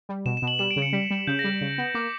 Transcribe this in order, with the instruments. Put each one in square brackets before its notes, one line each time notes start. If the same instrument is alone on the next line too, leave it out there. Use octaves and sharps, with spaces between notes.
[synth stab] G3
[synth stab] B2 [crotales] E7
[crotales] E7
[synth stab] B2
[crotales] F#7
[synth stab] G3 [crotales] E7
[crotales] D7
[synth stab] C#3
[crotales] C#7
[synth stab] G3 [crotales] B6
[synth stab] G3
[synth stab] C#3 [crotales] G6
[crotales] A#6
[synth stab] G3
C#3
B3
[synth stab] A#3 [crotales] D6